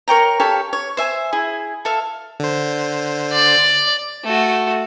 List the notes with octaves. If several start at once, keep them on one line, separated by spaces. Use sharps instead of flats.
A#4 C#5 G5 A#5
G4 A4 C#5 F5
C#5
C5 E5 G#5
E4 G#4
A4 E5 F5
D3 C5
D5
A3 F#4